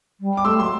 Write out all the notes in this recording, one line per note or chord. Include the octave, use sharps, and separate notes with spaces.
G3
D6
A3 C6 E6
F#3 C6